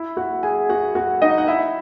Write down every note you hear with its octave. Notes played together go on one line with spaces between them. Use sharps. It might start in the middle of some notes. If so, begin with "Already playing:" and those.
Already playing: E4 E5
F#4 F#5
G#4 G#5
F#4 F#5
F#4 F#5
D#4 D#5
F#5
E4 E5